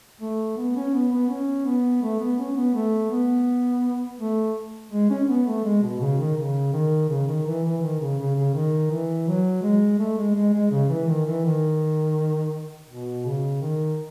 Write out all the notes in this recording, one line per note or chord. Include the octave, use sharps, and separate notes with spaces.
A3
B3
C#4
B3
B3
C#4
B3
A3
B3
C#4
B3
A3
B3
A3
G#3
C#4
C#4
B3
A3
G#3
B2
C#3
D#3
C#3
D#3
C#3
D#3
E3
E3
D#3
C#3
C#3
C#3
D#3
E3
F#3
G#3
A3
G#3
G#3
G#3
C#3
E3
D#3
E3
D#3
B2
C#3
D#3